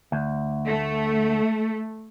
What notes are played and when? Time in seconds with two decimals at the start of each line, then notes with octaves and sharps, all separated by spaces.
0.12 D2
0.66 A3